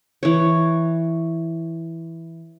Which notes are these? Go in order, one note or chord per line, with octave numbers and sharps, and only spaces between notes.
E3 C#5